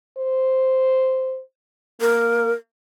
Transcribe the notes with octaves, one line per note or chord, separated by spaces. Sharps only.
C5
A#3 A#4